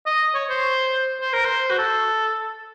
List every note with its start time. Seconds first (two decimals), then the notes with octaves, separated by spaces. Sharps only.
0.06 D#5
0.34 C#5
0.49 C5
1.21 C5
1.33 A#4
1.45 C5
1.71 F#4
1.78 A4